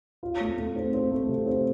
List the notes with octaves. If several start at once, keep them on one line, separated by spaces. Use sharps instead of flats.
F4
A3
A3
C4
C4
A3
C3
C4